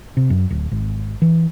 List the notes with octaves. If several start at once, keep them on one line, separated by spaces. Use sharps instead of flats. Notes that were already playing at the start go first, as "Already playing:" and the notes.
C3
F#2
D1
G#1
E3